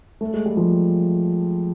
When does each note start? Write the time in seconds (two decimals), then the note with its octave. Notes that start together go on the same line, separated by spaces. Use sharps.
0.21 A3
0.34 G#3
0.46 G3
0.57 F3